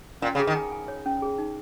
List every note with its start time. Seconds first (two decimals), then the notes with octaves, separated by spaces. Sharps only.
0.22 A#2 C#4
0.35 C#3
0.40 G#4
0.47 D#3
0.55 G#5
0.72 G#5
0.88 C#5
1.06 C#4
1.22 G#4
1.38 D#4